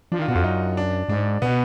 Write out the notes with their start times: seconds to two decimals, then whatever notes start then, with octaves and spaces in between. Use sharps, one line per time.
0.12 F3 D4
0.19 D#3 F4
0.28 B2 F#4
0.35 F2 F4
0.44 F#2 D#4
0.77 D4
1.09 G#2 D4
1.42 B2 B3